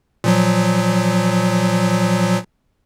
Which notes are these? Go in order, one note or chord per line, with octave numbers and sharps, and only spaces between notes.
A#2 F3 F#3